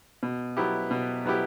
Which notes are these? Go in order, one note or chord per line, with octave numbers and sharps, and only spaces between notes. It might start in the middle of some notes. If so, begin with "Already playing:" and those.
B2
F#3 B3 E4 G4
B2
F#3 B3 E4 G4